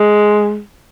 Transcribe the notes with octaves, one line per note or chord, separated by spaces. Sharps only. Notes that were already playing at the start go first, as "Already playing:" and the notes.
Already playing: G#3